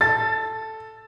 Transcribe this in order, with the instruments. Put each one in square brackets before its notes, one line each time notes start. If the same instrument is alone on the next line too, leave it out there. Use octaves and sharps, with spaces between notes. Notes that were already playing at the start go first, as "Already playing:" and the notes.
[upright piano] A4 [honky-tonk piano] A6